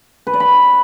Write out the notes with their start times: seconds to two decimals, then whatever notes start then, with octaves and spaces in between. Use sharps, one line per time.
0.27 B4
0.33 D5
0.40 B5